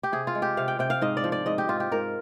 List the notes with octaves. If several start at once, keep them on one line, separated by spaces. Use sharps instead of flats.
G4
C3 G#4
F4
G#3
G4
C3 F5
G5
C3 G5
F5
G#2 D#5
D5
F3
D5
G#2 D#5
G4
G#2 F4
G4
G#2 A#4